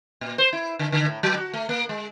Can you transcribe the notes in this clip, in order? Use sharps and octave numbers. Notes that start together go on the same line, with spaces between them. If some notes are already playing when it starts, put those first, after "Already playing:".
A#2
C5
E4
D3
D3
A2
F#3
F#4
A3
A#3
G#3